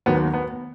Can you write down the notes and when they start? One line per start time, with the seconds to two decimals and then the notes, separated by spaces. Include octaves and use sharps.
0.06 D#2 D#3 F#3 B3
0.34 B3